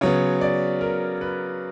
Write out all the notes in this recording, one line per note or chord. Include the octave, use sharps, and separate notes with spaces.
C#3 F#3 B3 C#5
D5
A#4
B4